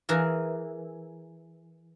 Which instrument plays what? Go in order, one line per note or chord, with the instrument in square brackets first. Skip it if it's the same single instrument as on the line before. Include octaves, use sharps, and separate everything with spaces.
[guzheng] E3 G#4 A#4